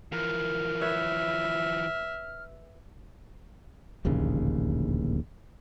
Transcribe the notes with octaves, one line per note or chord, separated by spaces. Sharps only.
E3 F3 A#4 F6
B4 C#5 E5
D1 A#1 D#2 C#3